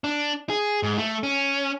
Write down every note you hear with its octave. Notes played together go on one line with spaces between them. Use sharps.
D4
G#4
G#2
A3
C#4